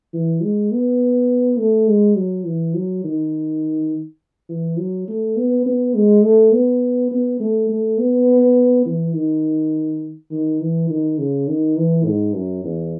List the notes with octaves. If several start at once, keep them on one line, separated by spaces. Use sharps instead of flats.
E3
G#3
B3
A3
G#3
F#3
E3
F#3
D#3
E3
F#3
A3
B3
B3
G#3
A3
B3
B3
A3
A3
B3
E3
D#3
D#3
E3
D#3
C#3
D#3
E3
G#2
F#2
E2